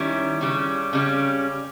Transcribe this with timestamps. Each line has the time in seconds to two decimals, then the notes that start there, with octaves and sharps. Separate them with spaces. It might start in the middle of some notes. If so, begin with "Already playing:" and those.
Already playing: D#3 G3 C#4 E4
0.41 C#3 G3 C#4
0.93 C#3 G3 C#4